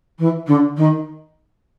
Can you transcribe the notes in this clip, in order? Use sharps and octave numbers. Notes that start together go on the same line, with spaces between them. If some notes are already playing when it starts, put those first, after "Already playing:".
E3
D3
D#3